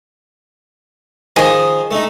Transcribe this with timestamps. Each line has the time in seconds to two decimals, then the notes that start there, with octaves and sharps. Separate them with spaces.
1.36 D#3 F3 G#4 D#5
1.91 A3 D#4